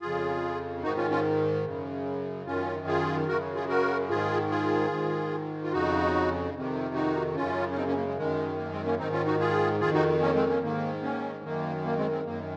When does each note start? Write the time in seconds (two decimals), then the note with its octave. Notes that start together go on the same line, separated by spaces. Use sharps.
0.02 F2 C#3 F4 G#4
0.83 G#2 D#3 D#4 F#4
0.97 C#4 F4
1.10 C#4 F4
1.65 F#2 C#3
2.46 F#2 D#3 C#4 F4
2.87 F4 G#4
3.28 F#2 C#3 F#4 A#4
3.55 F4 G#4
3.69 F#4 A#4
4.09 G#2 D#3 F4 G#4
4.50 F4 G#4
4.91 G#2 D#3
5.63 F4
5.73 F2 C#3 D#4 F#4
6.54 F2 C3 D#3
6.95 D#4 F#4
7.36 F#2 C#3 C#4 F4
7.71 C#4
7.76 C4 D#4
7.87 A#3 C#4
7.97 A#3
8.07 G#3
8.17 F#2 D#3 G#3
8.58 A#3
8.72 G#3 C4
8.85 A#3 C#4
8.99 G#2 D#3 C4 D#4
9.13 C#4 F4
9.26 D#4 F#4
9.40 F4 G#4
9.80 F2 D#3 F4 G#4
9.94 D#4 F#4
10.22 A#3 C#4
10.35 G#3 C4
10.49 A#3 C#4
10.62 G#2 D#3 A#3
11.03 A#3 C#4
11.44 F#2 D#3 A#3
11.85 A#3
11.98 G#3 C4
12.11 G#3 C4
12.25 F#2 D#3 A#3